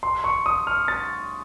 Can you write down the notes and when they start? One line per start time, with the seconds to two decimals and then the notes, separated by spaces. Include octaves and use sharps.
0.03 C6
0.24 C#6
0.46 D#6
0.67 F6
0.88 A6